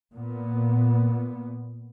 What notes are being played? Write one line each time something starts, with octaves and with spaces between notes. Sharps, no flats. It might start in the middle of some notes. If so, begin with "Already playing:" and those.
A#2 B3